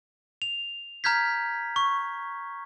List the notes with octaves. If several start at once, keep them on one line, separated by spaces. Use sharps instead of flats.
F7
A#5 F6 G6 G#6 B6
C#6